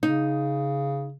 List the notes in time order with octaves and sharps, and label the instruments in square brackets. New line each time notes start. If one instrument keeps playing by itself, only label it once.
[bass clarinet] C#3 [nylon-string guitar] D#4